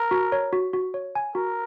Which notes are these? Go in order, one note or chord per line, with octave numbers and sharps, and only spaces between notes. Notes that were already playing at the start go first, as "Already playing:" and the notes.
Already playing: A#4
F#4
C#5
F#4
F#4
C#5
G#5
F#4 A#4